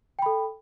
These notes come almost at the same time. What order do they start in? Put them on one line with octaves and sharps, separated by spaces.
G5 B5 A4